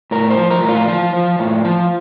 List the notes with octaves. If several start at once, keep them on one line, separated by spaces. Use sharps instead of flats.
A2 A#4
C5
F3
A#4
A2
F4
F3 F4
F3
A2
F3